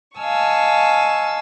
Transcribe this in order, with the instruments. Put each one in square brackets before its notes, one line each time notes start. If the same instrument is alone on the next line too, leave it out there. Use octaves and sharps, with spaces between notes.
[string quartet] D#5 F5 G#5 A5 C#6 E6